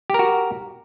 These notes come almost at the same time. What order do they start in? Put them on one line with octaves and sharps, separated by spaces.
G4 A#4 F#4